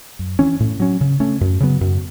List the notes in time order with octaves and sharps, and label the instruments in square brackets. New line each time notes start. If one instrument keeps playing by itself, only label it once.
[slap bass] F#2
E3 C#4
A2
F#3 C#4
C#3
A3 C#4
F#2
C#3 F#3 B3
F#2